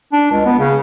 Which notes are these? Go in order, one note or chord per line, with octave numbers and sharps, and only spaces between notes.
D4
C#2
B3
C#3